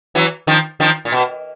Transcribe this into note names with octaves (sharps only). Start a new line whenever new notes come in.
E3 F#3
D#3 F3
D#3 F3
A#2
B2